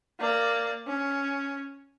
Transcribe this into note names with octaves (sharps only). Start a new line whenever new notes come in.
A#3 D5
C#4